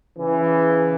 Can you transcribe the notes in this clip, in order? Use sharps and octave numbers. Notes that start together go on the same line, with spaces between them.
C#3 E3